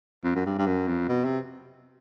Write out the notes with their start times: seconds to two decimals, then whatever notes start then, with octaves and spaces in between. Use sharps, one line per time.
0.24 F2
0.35 F#2
0.46 G2
0.59 G2
0.66 F#2
0.88 F2
1.09 B2
1.25 C3